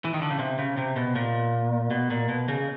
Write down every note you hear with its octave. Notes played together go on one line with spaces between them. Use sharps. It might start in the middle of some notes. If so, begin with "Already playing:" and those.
E3
D#3
D3
C#3
C3
C#3
C3
B2
A#2
B2
A#2
B2
C#3